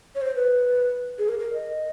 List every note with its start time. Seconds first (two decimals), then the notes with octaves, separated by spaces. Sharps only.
0.15 C#5
0.21 C5
0.36 B4
1.19 G#4
1.29 A#4
1.39 A#4
1.54 D#5